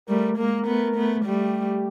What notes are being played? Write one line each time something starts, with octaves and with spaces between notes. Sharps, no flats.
G3 A3 A#4
G#3 A#3 A#4
A3 B3
A3 B3
G3 A3 G4